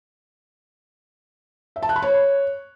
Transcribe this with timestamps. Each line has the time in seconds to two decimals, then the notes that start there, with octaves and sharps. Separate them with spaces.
1.76 E5
1.83 A5
1.89 F#6
1.96 B5
2.02 C#5